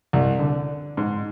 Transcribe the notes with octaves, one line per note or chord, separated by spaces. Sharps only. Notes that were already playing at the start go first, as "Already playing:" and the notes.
C2
D3
G#2